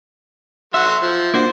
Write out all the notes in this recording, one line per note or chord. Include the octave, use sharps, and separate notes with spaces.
F#3 F#4 E5 C6
F3
A#3 D4 F#4 C5